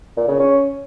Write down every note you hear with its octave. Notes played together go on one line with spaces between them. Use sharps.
A#2
C#3
C#4